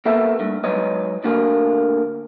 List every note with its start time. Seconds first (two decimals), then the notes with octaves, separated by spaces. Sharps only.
0.05 A#3 B3 A4 E5
0.39 G2 A3
0.64 G#2 F#3 B4 C#5 D#5
1.24 A#2 D3 A3 A#3